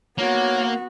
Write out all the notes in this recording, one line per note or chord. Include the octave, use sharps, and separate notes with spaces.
A#3 B3 F#4 C#5